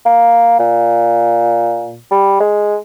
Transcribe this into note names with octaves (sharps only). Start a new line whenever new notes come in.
A#3
A#2
G3
G#3